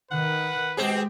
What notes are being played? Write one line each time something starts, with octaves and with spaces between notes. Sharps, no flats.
D#3 B4 F#5
B2 G#3 C4 G4 G#4